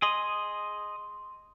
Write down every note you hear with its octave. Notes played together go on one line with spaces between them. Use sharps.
G#4 D#5 C6